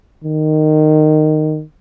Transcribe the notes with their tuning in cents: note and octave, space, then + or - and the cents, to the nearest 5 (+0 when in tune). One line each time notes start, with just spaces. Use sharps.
D#3 -15